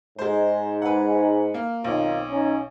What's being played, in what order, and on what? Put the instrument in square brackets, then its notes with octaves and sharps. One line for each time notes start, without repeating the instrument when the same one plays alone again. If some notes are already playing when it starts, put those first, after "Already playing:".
[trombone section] G#2 [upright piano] G#3 C5
[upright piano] B4 F#5
A#3
[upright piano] B1 [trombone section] D#3 C4 F4
[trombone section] C#4 D#4